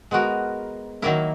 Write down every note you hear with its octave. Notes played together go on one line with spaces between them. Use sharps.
G#3 B3 F#4 A#4
D#3 F#3 A#3 E4 A#4